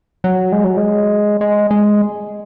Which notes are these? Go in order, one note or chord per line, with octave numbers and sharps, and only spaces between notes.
F#3
G#3
F#3
G#3
G#3
G#3